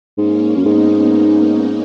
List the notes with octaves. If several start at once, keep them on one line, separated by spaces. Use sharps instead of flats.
G#2 A#3 C#4
F#2
G#2 B3 D#4